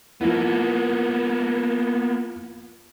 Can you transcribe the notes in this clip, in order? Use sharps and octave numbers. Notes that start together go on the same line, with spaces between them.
F3 A#3 B3 E4